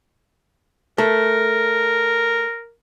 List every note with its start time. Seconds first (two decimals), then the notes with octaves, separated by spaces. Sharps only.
0.98 A3 A#4